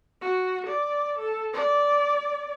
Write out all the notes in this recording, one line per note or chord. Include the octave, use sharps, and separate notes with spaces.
F#4
D5
A4
D5